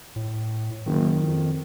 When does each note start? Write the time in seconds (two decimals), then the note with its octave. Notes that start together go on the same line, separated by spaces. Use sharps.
0.16 A2
0.86 F#1 D#3
1.20 F2